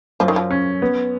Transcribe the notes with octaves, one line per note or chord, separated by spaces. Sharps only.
F#2 F3
D#3
F3
C#4
B3